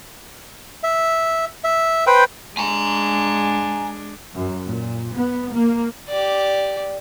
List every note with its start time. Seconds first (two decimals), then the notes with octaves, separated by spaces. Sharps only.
0.83 E5
1.64 E5
2.07 B4 C5 G5
2.57 G#3 D4 G#5 A#5
4.34 F#2
4.67 A#2
5.16 B3
5.54 A#3
6.09 G4 D5